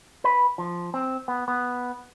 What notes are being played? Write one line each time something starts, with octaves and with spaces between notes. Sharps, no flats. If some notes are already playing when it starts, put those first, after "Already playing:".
B4
F3
C4
B3
B3